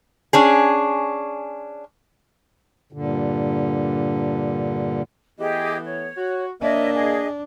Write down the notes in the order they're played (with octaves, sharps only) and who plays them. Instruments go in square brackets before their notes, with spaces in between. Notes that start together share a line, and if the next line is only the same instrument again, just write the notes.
[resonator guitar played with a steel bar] C#4 D4 G#4
[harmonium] G2 A#2 D3
[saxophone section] E3 A3 B3 [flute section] G4 G#4 D#5
[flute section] C#5
[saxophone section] F#4
[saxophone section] A#3 [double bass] D4 [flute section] C#5 D#5 E5
[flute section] G#4 D#5